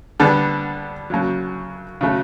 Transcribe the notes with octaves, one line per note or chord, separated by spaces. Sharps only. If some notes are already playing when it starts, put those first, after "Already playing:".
D3 G3 B3 D4
F#2 C#3 F#3
C#3 F#3 A3